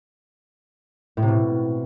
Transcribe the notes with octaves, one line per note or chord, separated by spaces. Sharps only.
A2
C3
B2